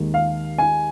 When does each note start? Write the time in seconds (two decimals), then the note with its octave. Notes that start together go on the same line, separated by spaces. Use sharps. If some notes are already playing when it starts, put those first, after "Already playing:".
Already playing: D#2 D#3 G#3
0.14 F5
0.58 G#5